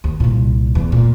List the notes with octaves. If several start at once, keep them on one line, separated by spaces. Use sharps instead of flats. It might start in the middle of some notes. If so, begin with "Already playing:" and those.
D#2
C2 A#2
E2
A#2